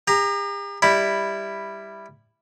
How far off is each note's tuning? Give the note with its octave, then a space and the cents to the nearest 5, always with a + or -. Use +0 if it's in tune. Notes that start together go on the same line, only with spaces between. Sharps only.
G4 +45 A#5 +0
G3 +10 E4 +0 B5 +0